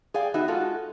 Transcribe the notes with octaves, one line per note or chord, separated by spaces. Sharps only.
G#4 D5 F5 G5
B3 D#4 F#4 E5
G#3 F4 F#4 A4